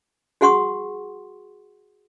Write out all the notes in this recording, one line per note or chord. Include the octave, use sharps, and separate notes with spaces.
F#4 G#4 F#5 C6 C#6 D#6